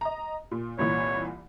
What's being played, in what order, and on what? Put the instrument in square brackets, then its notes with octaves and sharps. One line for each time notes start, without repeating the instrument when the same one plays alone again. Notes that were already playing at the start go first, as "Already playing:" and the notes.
[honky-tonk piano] D#5 A#5
A#2
[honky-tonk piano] C2 A#2 E3 [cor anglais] C#5